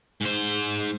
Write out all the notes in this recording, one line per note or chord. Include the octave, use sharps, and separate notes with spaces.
G#2 C5